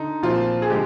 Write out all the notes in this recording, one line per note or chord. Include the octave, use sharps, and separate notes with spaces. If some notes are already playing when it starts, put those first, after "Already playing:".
Already playing: D3 D#4
A#2 F3 C4 F4
G#4
D3 G#3 G4